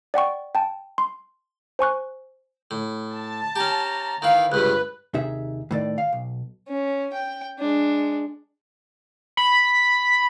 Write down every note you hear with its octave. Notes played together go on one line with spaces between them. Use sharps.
D5 F#5 G5 C#6
G5 A5
C6
C5 G#5 C#6 F#6
A2
A5
C#4 G4 A#5
D#3 E3 B4 F5
C#2 G2 C3 B4 F#6
D#2 C3 D#4 G#4 E5
A2 D#3 D5
F5
B1
C#4
G5
G#3 D4
B5